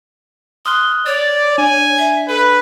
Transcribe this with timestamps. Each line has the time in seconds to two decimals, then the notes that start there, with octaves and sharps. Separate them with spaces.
0.66 C6 D#6 F6 F#6
1.06 C#5 D5 A6
1.58 D4 G#5
1.98 E5
2.28 A4 B4